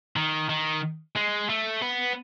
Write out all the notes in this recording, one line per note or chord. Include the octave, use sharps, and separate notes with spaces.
D#3
D#3
G#3
A3
B3